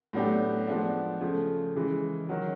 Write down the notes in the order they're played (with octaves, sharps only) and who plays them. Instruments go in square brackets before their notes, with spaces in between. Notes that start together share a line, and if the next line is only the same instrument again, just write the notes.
[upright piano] A2 F#3 B3 D4 G4
F3 G#3 B3 D4
C#3 F3 A3
C#3 E3 G#3
D#3 F#3